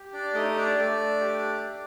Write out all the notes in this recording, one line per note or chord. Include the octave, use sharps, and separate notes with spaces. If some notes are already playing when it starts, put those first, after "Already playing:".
Already playing: G4
D4 D5
A3 D#4 D#5
D4 D5
A3
G4
G4